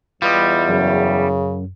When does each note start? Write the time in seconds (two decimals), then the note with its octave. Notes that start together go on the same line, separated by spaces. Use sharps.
0.22 E2 G3 F4 B4 D#5
0.69 F#2 C#3